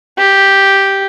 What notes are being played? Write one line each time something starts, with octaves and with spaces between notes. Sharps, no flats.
G4